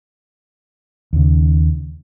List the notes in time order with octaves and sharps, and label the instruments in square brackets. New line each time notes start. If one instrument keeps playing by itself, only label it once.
[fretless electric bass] D#2 C#3